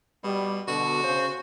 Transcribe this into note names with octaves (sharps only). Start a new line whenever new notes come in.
B2 G3
B2 D3 F#4
C#3 C5